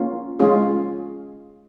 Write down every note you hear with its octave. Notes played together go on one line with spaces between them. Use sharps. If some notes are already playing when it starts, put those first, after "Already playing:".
Already playing: A#3 C#4 F4
G#3 C#4 F4 G#4